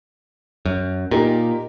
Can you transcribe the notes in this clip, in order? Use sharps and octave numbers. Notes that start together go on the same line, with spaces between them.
F#2
A#2 D#4 G4 A#4